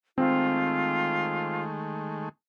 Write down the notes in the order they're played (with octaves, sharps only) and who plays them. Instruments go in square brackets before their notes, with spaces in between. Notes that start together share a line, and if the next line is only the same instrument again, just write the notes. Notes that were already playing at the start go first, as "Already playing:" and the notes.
[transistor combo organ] D#3 G#3 A3 [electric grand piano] C4 [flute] F4